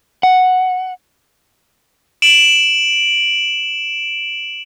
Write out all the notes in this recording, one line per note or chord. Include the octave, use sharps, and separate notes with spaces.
F#5
D7 E7 F#7